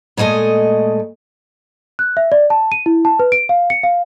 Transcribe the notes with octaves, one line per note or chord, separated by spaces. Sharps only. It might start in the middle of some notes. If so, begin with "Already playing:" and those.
A#2 G#3 A3 D#5 G#5
F#6
E5
D5
A5
D#7
E4
A5
B4
D7
F5
C#7
F5